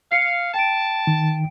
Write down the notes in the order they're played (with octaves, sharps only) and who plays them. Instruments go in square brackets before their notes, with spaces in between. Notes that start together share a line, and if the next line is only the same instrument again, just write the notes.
[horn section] F5 [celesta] C7 C#7
[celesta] G5 D7 [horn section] A5
[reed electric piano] D#3